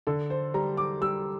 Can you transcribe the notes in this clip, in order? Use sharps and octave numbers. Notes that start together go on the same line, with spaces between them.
D3 A4
C5
G3 A#5
D6
G3 E6